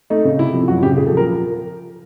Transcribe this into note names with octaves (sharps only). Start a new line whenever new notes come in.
A3 D#4
C#3
C3 E4
F3
F#2 F#4
C#3 G4
A#2 G#4
A4
F3
A#4